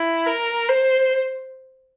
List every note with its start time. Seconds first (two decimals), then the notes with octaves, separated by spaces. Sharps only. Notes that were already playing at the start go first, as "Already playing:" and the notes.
Already playing: E4
0.27 A#4
0.69 C5